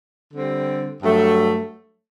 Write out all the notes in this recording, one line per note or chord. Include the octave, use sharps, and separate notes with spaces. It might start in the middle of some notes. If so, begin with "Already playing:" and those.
D3 G3 C4
G2 F#3 A3